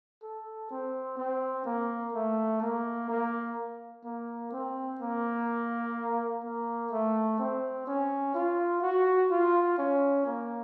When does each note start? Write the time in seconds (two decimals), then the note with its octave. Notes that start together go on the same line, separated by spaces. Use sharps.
0.23 A4
0.71 C4
1.18 C4
1.65 A#3
2.14 A3
2.62 A#3
3.10 A#3
4.05 A#3
4.52 C4
5.01 A#3
6.44 A#3
6.92 A3
7.39 C4
7.87 C#4
8.34 F4
8.82 F#4
9.31 F4
9.78 C#4
10.26 A#3